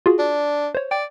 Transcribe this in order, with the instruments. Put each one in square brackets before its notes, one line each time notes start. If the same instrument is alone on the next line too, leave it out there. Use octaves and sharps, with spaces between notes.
[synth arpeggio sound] F4 F#4 G#4
[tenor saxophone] D4
[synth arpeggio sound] C5 C#5
[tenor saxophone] D5 [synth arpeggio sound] G5